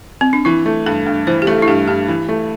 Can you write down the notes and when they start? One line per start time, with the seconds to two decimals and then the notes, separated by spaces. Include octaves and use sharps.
0.21 C4
0.33 D4
0.45 E3 E4
0.66 A3
0.86 G2 A4
1.06 G2
1.27 E3 C5
1.42 G4
1.47 A3 A4
1.62 E4
1.68 G2 G4
1.88 G2 G4
2.08 E3
2.29 A3